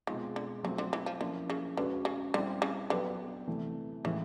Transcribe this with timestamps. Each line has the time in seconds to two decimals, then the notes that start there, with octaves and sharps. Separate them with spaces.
0.07 B2 D#3 G#3 C4 F4
0.36 D3
0.63 C#3 F#3 A3 C4 F4
0.78 D3
0.93 E3
1.06 F3
1.20 D3 F3 A#3 C#4 E4
1.50 C#3
1.77 D3 G#3 C#4 F#4 B4
2.05 C#3
2.34 D3 G3 C4 E4
2.62 C#3
2.90 D3 F#3 B3 D4 G4 B4
3.47 C3 E3 A3
4.04 A2 C#3 E3 G#3